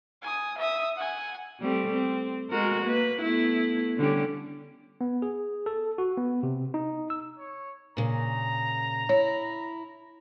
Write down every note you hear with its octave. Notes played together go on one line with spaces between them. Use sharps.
G#5 D#6
E5 D#6
F#5 G#5
G3 A3 C4
C4
G#3 F#4 A#4
A#3 B4
A3 B3 E4
D3 G3 C#4
B3
G#4
A4
F#4
B3
C3
D#4
E6
C#5
A#2 C#3 A#5
E4 C#5